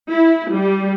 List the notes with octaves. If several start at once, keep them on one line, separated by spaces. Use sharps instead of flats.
E4
G3